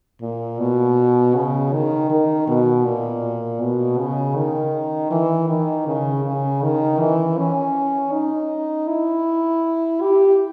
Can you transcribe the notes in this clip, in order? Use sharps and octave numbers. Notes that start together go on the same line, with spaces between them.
A#2
B2
C#3
D#3
D#3
B2
A#2
B2
C#3
D#3
E3
D#3
C#3
C#3
D#3
E3
C#4
D#4
E4
G4